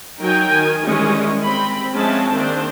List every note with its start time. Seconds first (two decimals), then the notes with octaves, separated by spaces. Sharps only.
0.19 F#3 D#4 A#4 G5 G#5
0.50 D#3 G#5
0.84 D#3 E3 G3 G#3 C#4
1.44 C4 B5
1.94 F3 G#3 C4 C#4 E5 A5
2.31 D#3 A#3 C4 D4 C5